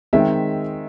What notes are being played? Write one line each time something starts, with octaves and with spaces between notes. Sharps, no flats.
D#3 G#3 C4 E5